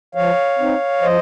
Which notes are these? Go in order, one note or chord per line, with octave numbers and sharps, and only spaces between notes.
F3 C#5 F5
C4 D#4
F3 C5 D#5